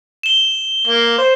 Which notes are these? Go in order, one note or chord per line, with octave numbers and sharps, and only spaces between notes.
E7 G7
A#3
C5